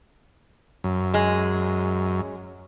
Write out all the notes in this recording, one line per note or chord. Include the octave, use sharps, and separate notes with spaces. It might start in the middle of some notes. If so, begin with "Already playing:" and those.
F#2
G#3